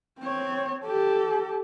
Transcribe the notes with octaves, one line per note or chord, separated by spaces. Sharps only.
C4 C#5
G4 A4